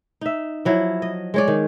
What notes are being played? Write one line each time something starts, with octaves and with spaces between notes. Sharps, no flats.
D#4 E5
F3 F#3 E4
D#5
G#3 C#5 D5
D#3